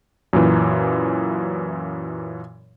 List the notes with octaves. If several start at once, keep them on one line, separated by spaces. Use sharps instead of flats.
F#2 A#2 E3